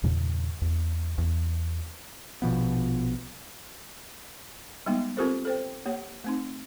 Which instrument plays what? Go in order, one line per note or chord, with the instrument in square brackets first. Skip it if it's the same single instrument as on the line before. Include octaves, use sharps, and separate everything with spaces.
[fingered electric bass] E2 G2 A#2 C#3
E2
E2
[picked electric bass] A#1 B2 F3 B3
[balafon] G3 G#3 A#3 B3 D#4
C4 F4 G4 A4 A#4 C5
A4 C5 G5
A#3 G4 C#5 F#5
A3 C4 D#4